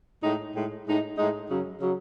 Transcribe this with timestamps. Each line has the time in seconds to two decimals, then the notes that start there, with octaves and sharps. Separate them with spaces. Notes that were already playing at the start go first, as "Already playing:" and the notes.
0.23 A2 G#3 D#4
0.54 A2 G#3 D#4
0.86 A2 G#3 D#4
1.18 A2 G#3 D#4
1.50 F#2 C#3 F#3
1.81 C#3 F#3